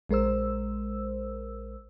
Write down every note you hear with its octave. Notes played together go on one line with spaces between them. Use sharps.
A#1 G#3 A#4 C5 E6